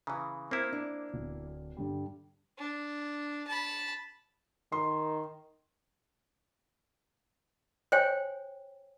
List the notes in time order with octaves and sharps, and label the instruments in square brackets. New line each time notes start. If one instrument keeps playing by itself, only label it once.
[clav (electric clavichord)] C#3 E3 [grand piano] A#5 B5 D#6
[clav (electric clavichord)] A#3 E4 [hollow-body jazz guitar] C4 [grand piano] A#4 C5 F6
[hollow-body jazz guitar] D4
[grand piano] D1
G2 D3 G3
[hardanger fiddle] D4
A5 B5
[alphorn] D#3 [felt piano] C6
[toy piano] C5 C#5 G5 G#5